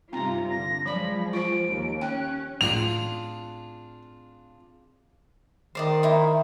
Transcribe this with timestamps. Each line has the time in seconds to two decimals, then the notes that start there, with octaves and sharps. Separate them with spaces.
0.12 G2 C3 C4 D#4 F4 A#5
0.50 D3 A#6
0.86 F3 F#3 G#3 D5 B5
1.33 F4 C5 D7
1.70 D#2
2.01 C#4 G5 F#6
2.61 A2 C4 D4 F4 G#4 F7
5.75 D#3 C5 D5 D#5
6.03 D#4 E4 C5